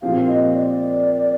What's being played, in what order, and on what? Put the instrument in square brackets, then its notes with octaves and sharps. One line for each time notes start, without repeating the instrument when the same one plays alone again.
[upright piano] A#2 F3 C4 G4 [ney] F5
[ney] D#5
D5